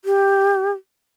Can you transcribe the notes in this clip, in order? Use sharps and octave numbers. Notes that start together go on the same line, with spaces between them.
G4